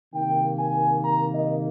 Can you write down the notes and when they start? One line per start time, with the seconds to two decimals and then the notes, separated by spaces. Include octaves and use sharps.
0.14 C3 D#3 A#3 G5
0.59 G#5
1.04 A#5
1.34 D#5